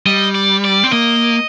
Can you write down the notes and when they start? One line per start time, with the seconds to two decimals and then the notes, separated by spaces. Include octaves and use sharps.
0.06 G3 D#5
0.35 D5
0.65 D5
0.84 C4
0.93 A#3 D#5